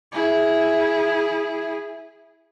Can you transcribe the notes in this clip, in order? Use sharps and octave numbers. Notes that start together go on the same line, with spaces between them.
E4 G#4